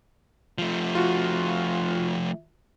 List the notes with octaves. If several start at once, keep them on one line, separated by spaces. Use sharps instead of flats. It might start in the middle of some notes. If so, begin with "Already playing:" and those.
F3 A3
F4 F#4